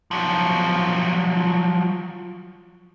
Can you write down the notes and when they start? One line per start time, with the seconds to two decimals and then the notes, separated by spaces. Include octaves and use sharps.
0.11 F3 F#3